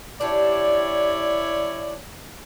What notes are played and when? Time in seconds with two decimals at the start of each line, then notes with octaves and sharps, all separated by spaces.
0.21 D4 E4 G4 C#5 D5